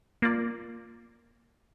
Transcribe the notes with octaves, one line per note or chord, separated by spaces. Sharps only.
A#3 F4 D5